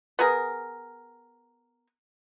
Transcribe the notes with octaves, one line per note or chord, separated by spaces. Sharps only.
B3 G#4 A#4